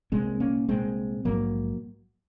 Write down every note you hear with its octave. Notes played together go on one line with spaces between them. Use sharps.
C2 A#2 G#3 C4
A#3 C#4
C2 A#2 G#3 C4
A#1 G#2 F#3 A#3